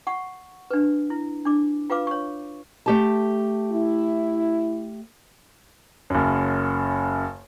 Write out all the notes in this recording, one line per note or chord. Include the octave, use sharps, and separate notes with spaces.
F#5 C#6
D4 B4
E4
D4 D6
F4 B4 F5 D6
C#5 C#6
A3 G4 A5
E4
F#1 F#2